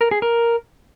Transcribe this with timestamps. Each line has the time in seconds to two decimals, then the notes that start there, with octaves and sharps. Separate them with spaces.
0.01 A#4
0.11 G#4
0.22 A#4